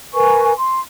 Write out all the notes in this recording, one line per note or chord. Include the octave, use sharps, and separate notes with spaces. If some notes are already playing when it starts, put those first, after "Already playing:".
A#4 B4 G#5 C#6
C6